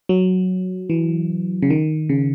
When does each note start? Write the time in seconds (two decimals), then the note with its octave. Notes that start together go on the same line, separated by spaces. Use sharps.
0.09 F#3
0.90 E3
1.62 C#3
1.70 D#3
2.09 C#3